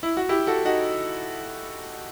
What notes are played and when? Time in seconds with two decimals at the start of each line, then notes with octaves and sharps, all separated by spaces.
0.03 E4
0.17 F#4
0.29 E4 G4
0.47 F#4 A4
0.65 D#4 F#4